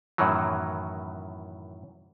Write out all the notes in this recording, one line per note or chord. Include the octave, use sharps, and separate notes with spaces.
F#2 A2 D#3 E3 F#3